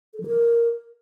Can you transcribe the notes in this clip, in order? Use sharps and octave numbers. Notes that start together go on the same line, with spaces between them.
A4
F3
A#4